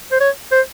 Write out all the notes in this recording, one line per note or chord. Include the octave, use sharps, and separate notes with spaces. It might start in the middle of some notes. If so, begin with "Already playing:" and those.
C5
C#5
C5